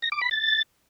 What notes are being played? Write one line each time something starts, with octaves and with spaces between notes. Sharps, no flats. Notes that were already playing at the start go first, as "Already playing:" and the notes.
A#6
D6
B5
A6